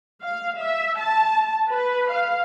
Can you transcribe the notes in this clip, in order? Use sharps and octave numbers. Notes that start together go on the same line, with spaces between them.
F5
E5
A5
B4
F5